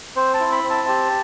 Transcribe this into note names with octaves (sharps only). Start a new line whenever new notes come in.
C4 C5
A5
E4
B5
C4
A5
G4